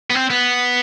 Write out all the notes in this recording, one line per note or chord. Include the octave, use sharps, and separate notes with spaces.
B3
C4
B3